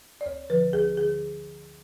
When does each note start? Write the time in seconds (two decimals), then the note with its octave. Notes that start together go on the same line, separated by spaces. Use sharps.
0.21 D5
0.26 D2 C#5
0.50 D3 F3 B4
0.73 D2 G#4
0.98 D3 G#4